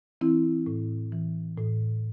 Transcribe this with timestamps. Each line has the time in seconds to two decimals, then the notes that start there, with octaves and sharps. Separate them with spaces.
0.21 E3 C4 E4
0.67 A2
1.12 E3
1.58 A2